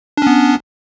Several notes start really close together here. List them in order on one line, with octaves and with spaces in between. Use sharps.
D4 C#4 B3